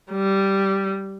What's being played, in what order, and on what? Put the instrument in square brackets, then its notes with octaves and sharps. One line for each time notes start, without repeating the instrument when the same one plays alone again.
[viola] G3